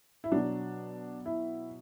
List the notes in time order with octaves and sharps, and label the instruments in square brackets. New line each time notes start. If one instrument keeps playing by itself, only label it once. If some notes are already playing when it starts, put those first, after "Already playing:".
[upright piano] E4
B2 F#3 D4
E4